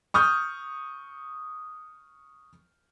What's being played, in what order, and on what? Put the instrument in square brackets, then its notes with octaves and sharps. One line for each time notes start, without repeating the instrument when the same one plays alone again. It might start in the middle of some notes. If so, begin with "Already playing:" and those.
[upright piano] C#6 D#6 F6 G6